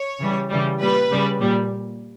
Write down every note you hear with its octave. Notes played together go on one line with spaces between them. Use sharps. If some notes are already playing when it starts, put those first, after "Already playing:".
Already playing: C#5
C#3 E3 G3
C#3 E3 G3
A#2 G3 B4
C#3 G3
A#2 G3